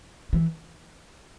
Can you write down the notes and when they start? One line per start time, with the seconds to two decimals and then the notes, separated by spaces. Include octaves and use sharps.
0.33 E3